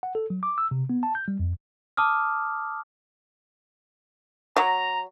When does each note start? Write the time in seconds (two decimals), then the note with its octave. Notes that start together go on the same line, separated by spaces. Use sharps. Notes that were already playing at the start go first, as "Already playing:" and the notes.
0.03 F#5
0.15 A4
0.30 F#3
0.43 D6
0.58 E6
0.71 C3
0.90 B3
1.03 A5
1.15 G6
1.28 G3
1.39 F2
1.97 A5 D6 D#6 F6
4.57 F#3 A#5